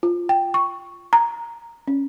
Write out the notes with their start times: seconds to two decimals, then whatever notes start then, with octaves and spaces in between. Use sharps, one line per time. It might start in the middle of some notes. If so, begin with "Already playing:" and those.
0.03 F4
0.29 G5
0.54 C#6
1.13 A#5
1.88 C#4